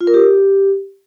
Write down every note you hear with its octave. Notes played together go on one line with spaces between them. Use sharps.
F4
A#4
G4